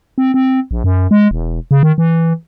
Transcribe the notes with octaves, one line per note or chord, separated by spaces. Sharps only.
C4
C4
A#1
F#2
G#3
E1
C#3
D#3
E3